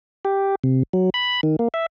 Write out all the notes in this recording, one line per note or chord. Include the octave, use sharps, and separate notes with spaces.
G4
C3
F#3
B5
D#3
A#3
E5